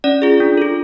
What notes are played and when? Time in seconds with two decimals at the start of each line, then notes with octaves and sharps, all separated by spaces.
0.04 C#4 D5
0.22 F4 G#4
0.40 D4
0.57 F4 A4